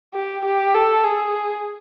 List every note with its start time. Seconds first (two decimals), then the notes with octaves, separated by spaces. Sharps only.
0.14 G4
0.45 G4
0.74 A4
1.04 G#4